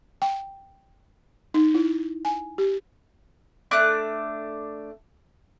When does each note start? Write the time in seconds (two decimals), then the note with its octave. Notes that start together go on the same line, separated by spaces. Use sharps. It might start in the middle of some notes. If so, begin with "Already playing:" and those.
0.22 G5
1.54 D#4
1.74 E4
2.25 G#5
2.58 G4
3.71 A3 D4 D6 F#6